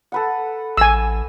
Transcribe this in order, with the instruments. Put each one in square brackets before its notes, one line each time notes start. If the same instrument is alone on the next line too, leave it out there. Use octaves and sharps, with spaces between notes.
[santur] A4 B4 F#5
[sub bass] A1 [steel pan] G#5 E6